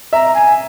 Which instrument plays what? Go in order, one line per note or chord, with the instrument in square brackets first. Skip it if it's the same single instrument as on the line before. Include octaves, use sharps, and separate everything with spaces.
[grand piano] E5 [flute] A#5
[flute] G#5